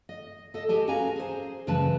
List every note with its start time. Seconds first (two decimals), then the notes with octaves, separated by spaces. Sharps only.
0.09 D#5
0.54 A4 D#5
0.69 G4 G#4 D#5 A5
0.87 B3 C#4 F#4 F5 G#5 A#5
1.16 G#4 C5
1.67 F#2 C#3 E3 G#3 B4 A5